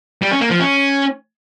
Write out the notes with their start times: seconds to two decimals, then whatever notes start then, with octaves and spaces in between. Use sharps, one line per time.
0.22 G3
0.31 C#4
0.41 A#3
0.50 F3
0.60 C#4